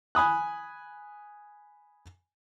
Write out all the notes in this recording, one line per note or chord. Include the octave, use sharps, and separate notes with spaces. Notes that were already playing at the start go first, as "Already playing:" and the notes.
G#5 B5 D#6 F#6